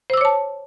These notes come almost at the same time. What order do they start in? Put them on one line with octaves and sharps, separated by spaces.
C5 E6 D6 C#5 A5